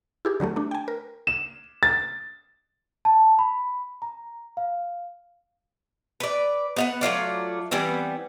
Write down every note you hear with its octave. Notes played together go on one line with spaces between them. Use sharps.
E4 G4 G#4
D3 F#3 G3 A3
A3 D4
G5 G#5
A#4
E7
A6
A5
B5
A#5
F5
B4 D5
B3 F5 F#5
F#3 A3 F4 D5
E3 G3 B3 C4